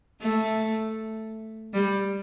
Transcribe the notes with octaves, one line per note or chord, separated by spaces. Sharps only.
A3
G3